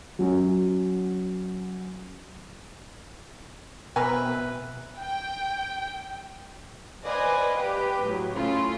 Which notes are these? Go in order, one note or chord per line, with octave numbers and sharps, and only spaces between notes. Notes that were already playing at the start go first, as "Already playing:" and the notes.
F#3 C#4 F#4
B2 C4 A#4 B4 E5 G#5
G5
B4 C5 D5 D#5 F5 G#5
G4 B4 G5
A2 F#3
C#3 A3 E4 F4